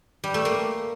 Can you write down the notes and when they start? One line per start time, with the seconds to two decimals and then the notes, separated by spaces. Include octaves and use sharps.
0.24 G3
0.34 A3
0.45 A#3